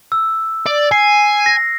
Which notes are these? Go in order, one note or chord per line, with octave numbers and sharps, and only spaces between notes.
E6
D5
G#5 C7
A#6